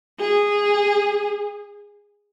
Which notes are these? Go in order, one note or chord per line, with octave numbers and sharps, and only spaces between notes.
G#4